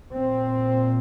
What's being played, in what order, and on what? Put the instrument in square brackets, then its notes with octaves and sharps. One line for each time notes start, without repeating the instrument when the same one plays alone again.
[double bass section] A#2 C4